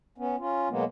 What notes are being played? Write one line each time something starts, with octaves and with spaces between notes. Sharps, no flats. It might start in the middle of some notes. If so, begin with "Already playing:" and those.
B3 C#4
C#4 F4
B2 F#3 G#3 A#3 B3